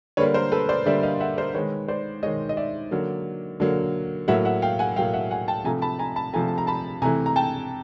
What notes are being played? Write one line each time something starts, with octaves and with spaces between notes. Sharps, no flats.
D3 G3 A#3 B4 C#5
A#4 C5
A4 B4
C5 D5
D3 G3 A#3 D5 E5
D#5 F5
E5 F#5
A#4 C5
D#3 G#3 B4 C#5
C5 D5
D#3 G#3 C#5 D#5
D#5
D5 E5
D3 F#3 A#3
D3 F#3 A#3
A2 F#3 A#3 E5 F#5
E5 F#5
F5 G5
F#5 G#5
A2 F#3 A#3 F5 G5
E5 F#5
F#5 G#5
G5 A5
C3 F3 A3 G#5 A#5
A5 B5
G#5 A#5
A5 B5
C3 F3 A3 G#5 A#5
A5
A#5
A5 B5
C3 E3 A3 G#5 A#5
A#5
G5 A5